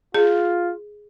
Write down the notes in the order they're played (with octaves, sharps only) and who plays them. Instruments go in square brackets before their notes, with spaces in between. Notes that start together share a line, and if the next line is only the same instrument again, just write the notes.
[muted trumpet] F4 [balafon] G#4